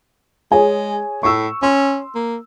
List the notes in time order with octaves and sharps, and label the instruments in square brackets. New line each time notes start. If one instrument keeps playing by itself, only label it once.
[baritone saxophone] G#3 [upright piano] G#4 C#5 G#5
[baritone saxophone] A2 [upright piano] C#6 E6
[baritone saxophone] C#4 [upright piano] C6
[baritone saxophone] A#3